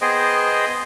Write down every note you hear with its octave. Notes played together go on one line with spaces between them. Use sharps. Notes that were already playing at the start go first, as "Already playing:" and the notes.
B3 G#4 C5 D#5 G5